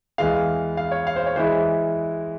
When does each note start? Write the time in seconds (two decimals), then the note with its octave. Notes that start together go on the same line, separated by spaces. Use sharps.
0.18 E2 E3 G#3 F5
0.77 F5
0.91 C#5
1.07 F5
1.16 C5
1.26 C#5
1.36 E3 G#3 E4 C5